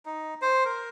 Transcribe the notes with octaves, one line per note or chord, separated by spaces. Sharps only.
D#4
C5
A#4